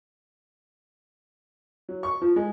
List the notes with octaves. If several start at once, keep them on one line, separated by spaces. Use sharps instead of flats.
F#3
C#6
F3
G#3